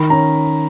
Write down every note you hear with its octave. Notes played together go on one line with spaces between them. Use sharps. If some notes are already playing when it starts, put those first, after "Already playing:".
Already playing: D#3 B5
C#4 A#5